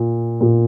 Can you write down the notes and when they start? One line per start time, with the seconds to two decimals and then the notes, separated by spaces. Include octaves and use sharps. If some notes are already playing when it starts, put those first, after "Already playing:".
Already playing: A#2
0.41 A#2